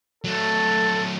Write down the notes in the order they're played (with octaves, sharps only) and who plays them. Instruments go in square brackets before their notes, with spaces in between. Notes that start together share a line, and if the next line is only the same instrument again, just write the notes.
[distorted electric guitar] F#3 A3 [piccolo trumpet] A4